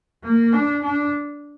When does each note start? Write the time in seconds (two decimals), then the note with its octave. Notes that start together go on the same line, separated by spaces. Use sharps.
0.24 A#3
0.52 D4
0.82 D4